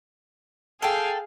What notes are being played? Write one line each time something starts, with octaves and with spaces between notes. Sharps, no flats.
G#4 A4 F5 G5